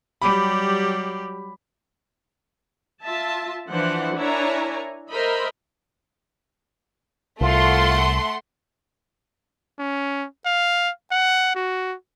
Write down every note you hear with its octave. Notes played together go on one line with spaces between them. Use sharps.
F#3 G3 G4 B5
F4 E5 A5
E3 F3 D4 C5 F#5
D4 E4 A#4 C#5 G#5 A#5
A#4 C5 D#5 E5 B5
C2 A3 F4 F#5 C6
C#4
F5
F#5
F#4